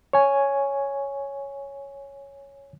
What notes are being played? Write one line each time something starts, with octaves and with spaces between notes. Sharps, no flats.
C#5 G#5